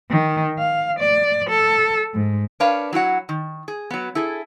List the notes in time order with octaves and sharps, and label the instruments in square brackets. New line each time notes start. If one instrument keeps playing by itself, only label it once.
[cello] D#3
F5
D5
A4
G#2
[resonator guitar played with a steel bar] D4 A#4 B4 C#5 F5
F#3 E4 F#4 F#5
D#3
G#4
F#3 B3
E4 G#4 A4